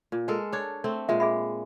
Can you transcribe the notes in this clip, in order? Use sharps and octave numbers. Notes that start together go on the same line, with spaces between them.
A#2
G#3 A4 A#4
D4 C#5
A3 C4
A#2 G#3 E5
G#4 E5 B5